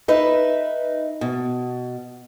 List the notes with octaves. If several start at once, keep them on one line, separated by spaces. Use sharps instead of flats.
D#4 B4 E5
B2